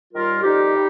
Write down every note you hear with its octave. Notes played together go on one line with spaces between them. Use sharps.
D#2 D#3 G3 F4 A#4
F2 D#3 G3 D#4 G4
G3